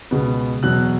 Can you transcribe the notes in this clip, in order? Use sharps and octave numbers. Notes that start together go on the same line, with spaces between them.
C#2 B2 G#3 B3
E2 B2 F#3 F#6